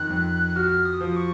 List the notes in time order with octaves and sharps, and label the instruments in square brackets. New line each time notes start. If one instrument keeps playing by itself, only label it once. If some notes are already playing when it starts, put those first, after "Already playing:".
Already playing: [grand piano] F2 D#3 [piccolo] F#6
[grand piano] F2
[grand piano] F#4 [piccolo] F6
[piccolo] D#6
[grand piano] F3
[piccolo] C#6